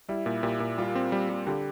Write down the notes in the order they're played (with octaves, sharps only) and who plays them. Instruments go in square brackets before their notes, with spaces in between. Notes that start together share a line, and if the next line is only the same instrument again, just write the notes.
[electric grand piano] G3 [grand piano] E4
[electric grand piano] A#2
[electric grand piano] A#2 [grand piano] G4
[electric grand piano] A#2
[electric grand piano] G3 [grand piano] F4
[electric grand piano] C4
G3
G3
[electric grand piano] D3 [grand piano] G4